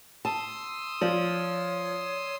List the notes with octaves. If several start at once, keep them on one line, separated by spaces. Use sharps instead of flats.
A5 C6 D#6 E6
F3 C#5 D5